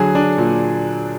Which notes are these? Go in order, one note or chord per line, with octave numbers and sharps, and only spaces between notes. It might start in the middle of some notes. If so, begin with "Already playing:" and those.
Already playing: D3 F#3 G#4 G#5
D4
A#2